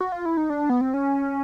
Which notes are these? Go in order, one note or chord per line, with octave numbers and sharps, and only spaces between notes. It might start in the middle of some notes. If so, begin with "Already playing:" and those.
F#4
F4
E4
D#4
D4
B3
C4
C#4